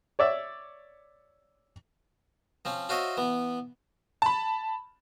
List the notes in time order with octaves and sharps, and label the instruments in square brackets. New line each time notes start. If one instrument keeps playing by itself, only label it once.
[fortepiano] C#5 D5 E5
[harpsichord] F3 C4 C#4
F4 F#4 C5 C#5 D#5 E5
E3 B3
[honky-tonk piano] A5 B5